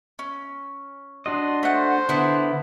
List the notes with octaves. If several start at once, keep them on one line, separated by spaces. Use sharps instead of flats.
C#4
D4 F#4 D#5 C6
A3 C5 F#5
D3 B3 E4